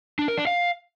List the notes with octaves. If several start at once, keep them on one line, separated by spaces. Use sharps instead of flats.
D4
A#4
D4
F5